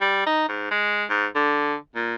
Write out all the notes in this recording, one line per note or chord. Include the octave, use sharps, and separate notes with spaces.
G3
D#4
G#2
G#3
G#2
D3
A#2